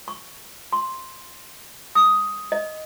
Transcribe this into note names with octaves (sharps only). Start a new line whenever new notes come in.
C#6
C6
D#6
D#5